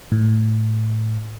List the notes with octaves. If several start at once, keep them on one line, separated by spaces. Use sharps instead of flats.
A2